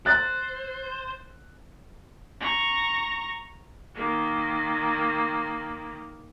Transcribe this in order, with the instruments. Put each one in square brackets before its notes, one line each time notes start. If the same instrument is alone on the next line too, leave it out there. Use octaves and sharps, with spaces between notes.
[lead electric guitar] C5 [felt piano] F#6 A6
[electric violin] A#5 C#6
[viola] D#3 A#3